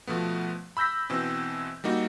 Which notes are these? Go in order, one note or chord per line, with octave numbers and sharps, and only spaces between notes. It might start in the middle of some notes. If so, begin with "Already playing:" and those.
B2 F3 A3 B3
B5 E6 G6 A#6 B6
B2 E3 C4
G3 A#3 D#4 F#4